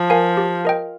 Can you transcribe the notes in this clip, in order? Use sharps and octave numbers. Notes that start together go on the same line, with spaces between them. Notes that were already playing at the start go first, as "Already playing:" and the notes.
Already playing: F3
A#4 F5 G#5
G4
A#4 D#5 G5